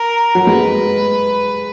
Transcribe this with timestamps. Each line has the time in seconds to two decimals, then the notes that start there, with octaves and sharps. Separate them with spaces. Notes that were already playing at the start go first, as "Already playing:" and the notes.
Already playing: A#4
0.35 F#3
0.46 G#3 B4